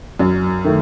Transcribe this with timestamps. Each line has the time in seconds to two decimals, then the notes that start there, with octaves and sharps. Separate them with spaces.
0.19 F#2
0.65 D#3 A3